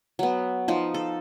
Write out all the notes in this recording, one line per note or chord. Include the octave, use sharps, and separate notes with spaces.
F#3 B3
F3 D#4
A4